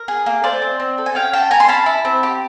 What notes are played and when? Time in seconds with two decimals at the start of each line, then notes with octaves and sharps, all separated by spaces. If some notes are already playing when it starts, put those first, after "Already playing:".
Already playing: A#4
0.08 G#4
0.26 A#3
0.43 A3 C5 D5
0.62 C4
0.80 C4
0.98 A4
1.06 G#5
1.15 C#4 F5 G5
1.33 C#4 G5 A5
1.51 C#4 G#5 A#5
1.60 C6
1.68 C#4 A5 B5
1.86 E4
2.05 C4
2.23 G4